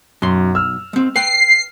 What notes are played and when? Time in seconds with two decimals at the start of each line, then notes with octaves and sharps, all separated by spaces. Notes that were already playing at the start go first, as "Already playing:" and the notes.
0.22 B1 F#2 C6
0.55 E6 F6
0.93 G#3 C4
1.16 B4 G5 C7